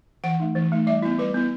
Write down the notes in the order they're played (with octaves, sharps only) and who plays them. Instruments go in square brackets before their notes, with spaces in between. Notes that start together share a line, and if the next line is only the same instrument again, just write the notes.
[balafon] E3 F#5
A3 D#4
E3
A3 D#4
G3 E5
B3 E4
G3 B4
B3 E4